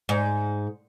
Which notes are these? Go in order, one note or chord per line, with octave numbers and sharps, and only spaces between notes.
G#2